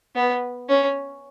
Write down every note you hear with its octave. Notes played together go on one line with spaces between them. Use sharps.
B3
C#4